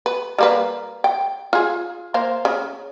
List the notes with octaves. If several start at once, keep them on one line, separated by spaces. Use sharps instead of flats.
B4
G3 A#3 B4
G5
F4 G#4
A#3 C5 F5
C#3